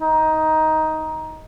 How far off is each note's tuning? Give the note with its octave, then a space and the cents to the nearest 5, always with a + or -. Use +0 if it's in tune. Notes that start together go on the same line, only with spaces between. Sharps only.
D#4 +10